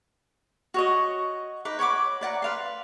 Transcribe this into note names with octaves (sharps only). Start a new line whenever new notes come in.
F#4 C#5 D#5
D#4 B4 D6
C#5 F#5 B5 D6
B4 D5 F#5 A#5
B4 F5 C6